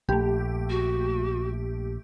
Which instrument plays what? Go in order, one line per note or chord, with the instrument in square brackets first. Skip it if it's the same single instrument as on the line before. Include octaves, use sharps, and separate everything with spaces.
[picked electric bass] A#1 [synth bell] A3 G4
[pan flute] F#4